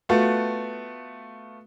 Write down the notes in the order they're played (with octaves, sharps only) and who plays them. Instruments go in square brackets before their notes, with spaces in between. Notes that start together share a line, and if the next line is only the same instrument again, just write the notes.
[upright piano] A3 B3 F4 F#4